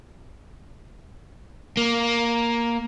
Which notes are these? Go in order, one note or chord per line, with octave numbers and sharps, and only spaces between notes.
A#3